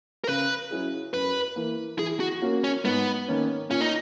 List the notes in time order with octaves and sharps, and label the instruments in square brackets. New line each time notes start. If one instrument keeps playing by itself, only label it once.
[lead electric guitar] A#4
[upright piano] C#3 [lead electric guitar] B4
[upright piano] F#3 C#4 E4 G#4
[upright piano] F#2 [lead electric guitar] B4
[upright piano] E3 A#3
[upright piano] E3 [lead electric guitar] G#4
[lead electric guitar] F#4
[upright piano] A#3 C#4 F#4
[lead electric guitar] C#4
[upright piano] G#2 [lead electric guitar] B3
[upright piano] D#3 A#3 C#4
[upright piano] A#2 [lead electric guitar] C#4
[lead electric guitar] D#4